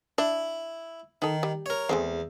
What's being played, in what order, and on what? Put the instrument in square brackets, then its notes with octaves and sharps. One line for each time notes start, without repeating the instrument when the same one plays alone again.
[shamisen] D4 [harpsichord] E4
[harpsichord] D#3 [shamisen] D#4 A4
[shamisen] G3
[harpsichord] A#4 C#5
[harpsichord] E2 [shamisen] G#3 A3 C4